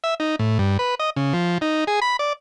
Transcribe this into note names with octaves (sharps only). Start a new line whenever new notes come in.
E5
D#4
A2
G2
B4
D#5
C#3
F3
D#4
G#4
B5
D5